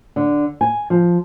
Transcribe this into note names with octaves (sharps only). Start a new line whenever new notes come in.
D3
G#5
F3